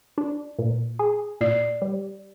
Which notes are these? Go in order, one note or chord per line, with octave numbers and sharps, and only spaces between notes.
D4
A#2
G#4
A#2 D5
G3